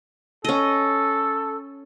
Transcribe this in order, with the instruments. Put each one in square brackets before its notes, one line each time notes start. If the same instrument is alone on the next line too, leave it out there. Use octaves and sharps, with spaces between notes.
[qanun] C#4 D#5 [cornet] A4